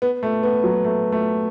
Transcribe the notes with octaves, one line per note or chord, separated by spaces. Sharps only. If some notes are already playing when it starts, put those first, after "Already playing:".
B3
A3
B3
F#3
A3
A3